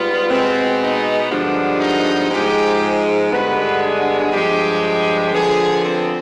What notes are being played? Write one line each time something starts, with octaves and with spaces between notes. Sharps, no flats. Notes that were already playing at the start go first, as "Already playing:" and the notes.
Already playing: G#2 G3 B3 F4
B2 G#3 B3 C4
D#4
G2 D3 F3 G#3 B3 D4
D#4
G#2 F3 G#3 G4
G2 D3 G#3 B3 B4
G#4
G2 F3 G#3 G4
G4
D3 F3 B3 G#4
C4